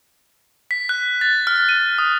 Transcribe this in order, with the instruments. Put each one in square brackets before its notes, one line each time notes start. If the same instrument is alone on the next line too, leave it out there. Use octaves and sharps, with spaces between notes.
[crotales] B6
F#6
A6
F6
D#7
D#6